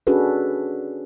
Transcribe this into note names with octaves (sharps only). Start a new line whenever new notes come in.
C#4 D4 F#4 G#4 A4 B4